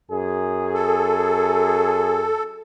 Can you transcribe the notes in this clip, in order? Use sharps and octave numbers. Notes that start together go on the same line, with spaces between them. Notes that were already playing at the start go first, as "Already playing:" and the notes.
F#2 G#4
A4